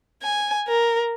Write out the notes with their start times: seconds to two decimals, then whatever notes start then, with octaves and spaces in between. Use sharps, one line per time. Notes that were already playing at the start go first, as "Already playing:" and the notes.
0.23 G#5
0.68 A#4